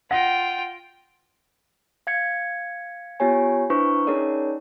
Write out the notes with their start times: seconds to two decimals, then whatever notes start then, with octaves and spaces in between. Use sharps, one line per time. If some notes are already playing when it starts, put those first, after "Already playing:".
0.11 F4 F#5 G5 A#6
2.07 F5 G#6 C#7
3.20 B3 F4 G4 C#5 G#5
3.70 D4 E4 B4 C5 C#6
4.07 C#4 D#4 G#4 A#4 C#5 D5